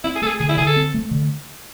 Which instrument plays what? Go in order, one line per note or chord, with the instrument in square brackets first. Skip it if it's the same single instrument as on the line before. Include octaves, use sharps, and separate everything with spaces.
[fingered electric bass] C4 [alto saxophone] E4
[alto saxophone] G#4
[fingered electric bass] A3 [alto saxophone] A4
[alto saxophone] G#4
[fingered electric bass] D3 [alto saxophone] G#4
[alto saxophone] E4
[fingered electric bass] D3 [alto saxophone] G#4
[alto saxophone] A4
[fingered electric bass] C4
A3
D3